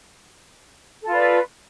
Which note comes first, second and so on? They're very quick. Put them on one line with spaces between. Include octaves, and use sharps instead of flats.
A4 F4 B4 D5